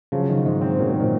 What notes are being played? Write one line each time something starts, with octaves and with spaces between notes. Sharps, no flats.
C#3 F3 F#3
D#3
G#2
C4
A#2 C#3 F#3
A#2
D#3
A#2